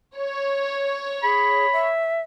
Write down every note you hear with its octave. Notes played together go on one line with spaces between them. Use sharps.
C#5
G#4 B5
E5